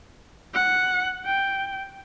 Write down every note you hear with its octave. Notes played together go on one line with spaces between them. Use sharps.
F#5
G5